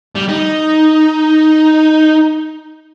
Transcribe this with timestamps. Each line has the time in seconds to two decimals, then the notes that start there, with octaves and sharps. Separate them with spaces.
0.15 G3
0.28 D#4